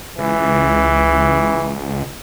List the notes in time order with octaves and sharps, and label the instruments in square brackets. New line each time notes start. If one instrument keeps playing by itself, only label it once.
[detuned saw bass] C#2 [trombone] E3